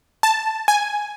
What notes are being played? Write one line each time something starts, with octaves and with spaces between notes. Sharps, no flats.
A5
G#5